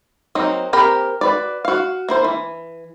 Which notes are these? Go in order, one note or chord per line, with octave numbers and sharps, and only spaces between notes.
F#3 A#3 C4 D#4
A#3 C4 G4 A#4 B5
F#4 B4 D5
F#4 F5
A#3 E4 C5
E3